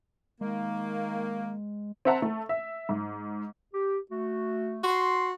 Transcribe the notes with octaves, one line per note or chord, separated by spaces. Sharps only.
D#3 G#3 A#3
C4 C5 E5 F#5 A5 A#5
A3
E5
G#2
G4
A3 F#4
F#4 C6